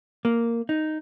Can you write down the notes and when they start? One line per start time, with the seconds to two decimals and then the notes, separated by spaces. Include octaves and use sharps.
0.25 A#3
0.69 D#4